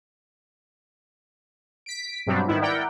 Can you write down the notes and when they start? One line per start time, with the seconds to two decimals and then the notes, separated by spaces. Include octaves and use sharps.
1.86 B6 D7
2.26 G2 B2 F#3 G3 C4 D4
2.48 G#2 D#3 B3 E4
2.61 E4 A#4 D5 F#5 G5